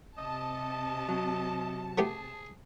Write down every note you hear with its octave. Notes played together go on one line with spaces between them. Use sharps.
C3 D#5 A5
F#3
A3 B3 G4 G#4